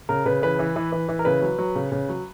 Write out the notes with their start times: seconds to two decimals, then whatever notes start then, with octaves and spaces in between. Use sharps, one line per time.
0.09 C#3 A#4
0.25 C#3 B4
0.42 E3 B4
0.59 E3
0.76 E3
0.92 E3
1.09 E3
1.19 A#4
1.25 C#3 B4
1.42 F#3
1.59 F#3
1.75 C#3
1.92 C#3
2.09 F#3